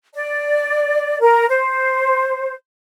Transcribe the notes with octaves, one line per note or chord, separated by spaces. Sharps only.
D5
A#4
C5